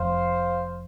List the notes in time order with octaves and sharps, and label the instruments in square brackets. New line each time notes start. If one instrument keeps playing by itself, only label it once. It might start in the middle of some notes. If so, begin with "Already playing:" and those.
Already playing: [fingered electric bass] F1 F2 F3 [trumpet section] C5 F5